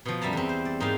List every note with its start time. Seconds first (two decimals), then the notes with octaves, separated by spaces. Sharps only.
0.06 B2 F3
0.21 F#2 G3 E5 A5 A#5
0.33 E2 C4
0.49 C5
0.65 D5
0.80 G#2 A#3 D#4 G4 F5